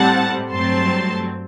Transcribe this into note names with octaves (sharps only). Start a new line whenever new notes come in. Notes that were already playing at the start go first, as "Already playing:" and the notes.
Already playing: A2 G3 C4 F#5 A5
G2 F#3 A3 C4 A5 C6